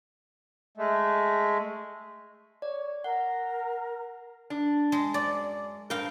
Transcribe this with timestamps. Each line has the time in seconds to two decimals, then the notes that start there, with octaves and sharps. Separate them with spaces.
0.77 G#3 A3
2.62 C#5 D5
3.04 A#4 F#5
4.50 D4
4.92 G#3
5.14 F#2 D5
5.90 G2 A#4 F5 G5